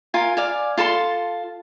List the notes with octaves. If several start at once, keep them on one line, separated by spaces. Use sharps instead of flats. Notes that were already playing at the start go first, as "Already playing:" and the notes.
F4 A#4 G#5
D5 F5 G#5
F4 A4 A5 C6